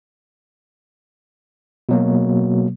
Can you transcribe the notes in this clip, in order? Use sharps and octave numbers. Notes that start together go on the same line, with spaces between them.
B2 F#3 A#3